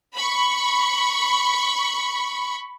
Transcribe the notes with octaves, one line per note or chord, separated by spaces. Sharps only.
B5 C#6